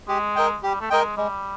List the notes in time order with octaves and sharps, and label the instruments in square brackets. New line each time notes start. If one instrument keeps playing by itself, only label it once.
[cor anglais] G#3 [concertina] G4
[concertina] A#4 D#5 G5
[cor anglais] G3 [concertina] G4
[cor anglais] A3
[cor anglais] G#3 [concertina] A#4 D#5 G5
[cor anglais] G3 [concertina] G#3